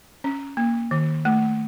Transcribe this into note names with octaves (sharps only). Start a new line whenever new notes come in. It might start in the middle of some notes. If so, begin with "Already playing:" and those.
C#4
A#3
D#3
A3